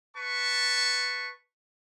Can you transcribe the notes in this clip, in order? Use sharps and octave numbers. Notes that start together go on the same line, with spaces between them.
B4 A5 C#6